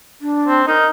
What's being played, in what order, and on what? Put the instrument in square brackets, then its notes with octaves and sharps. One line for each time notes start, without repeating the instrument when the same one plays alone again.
[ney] D4
[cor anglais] C4
[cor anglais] D#4 [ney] A#4